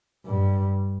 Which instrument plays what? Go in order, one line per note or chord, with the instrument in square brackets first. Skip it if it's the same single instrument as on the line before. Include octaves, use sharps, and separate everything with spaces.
[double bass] G2